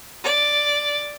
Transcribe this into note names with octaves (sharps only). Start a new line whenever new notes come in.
D5